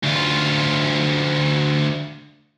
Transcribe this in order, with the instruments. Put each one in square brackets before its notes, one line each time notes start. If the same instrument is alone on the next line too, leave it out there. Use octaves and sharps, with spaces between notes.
[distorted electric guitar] D2 F4